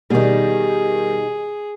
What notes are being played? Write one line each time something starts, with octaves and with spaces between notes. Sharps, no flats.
B2 D#3 G3 D#4 G#4